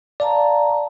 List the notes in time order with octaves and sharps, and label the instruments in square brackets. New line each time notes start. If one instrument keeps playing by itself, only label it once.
[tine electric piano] D5 [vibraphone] F5 A5 A#5